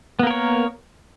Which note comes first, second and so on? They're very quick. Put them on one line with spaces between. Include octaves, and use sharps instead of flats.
B3 A#3 A#4 C#5